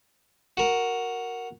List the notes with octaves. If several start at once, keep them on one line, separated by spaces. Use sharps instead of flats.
F#4 A#4